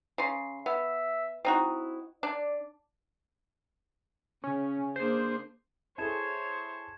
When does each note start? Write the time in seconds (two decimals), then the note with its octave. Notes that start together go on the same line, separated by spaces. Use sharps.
0.18 C#3 C6
0.66 B3 E5
1.45 C4 D#4 E4 F#4
2.23 D4 D5
4.44 C#3 C#4
4.96 A#3 D4 G#4 C5
5.98 E4 G#4 A4 C5 C#5 A5 G#6 E7